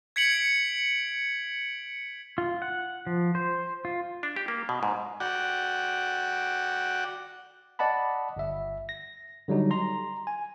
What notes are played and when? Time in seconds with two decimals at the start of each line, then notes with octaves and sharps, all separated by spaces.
0.16 G#6 B6 C#7 D7 F#7
2.38 F4
2.62 F#5
3.07 F3
3.35 C5
3.85 F4
4.23 D4
4.36 G4
4.48 A#3
4.69 B2
4.83 G#2
5.20 F#4 D5 F#5 G5
7.79 D5 D#5 F#5 A5 B5
8.37 G1 E5
8.89 A#6
9.48 D3 F#3 G3 D#4
9.71 A#5 C6
10.27 G#5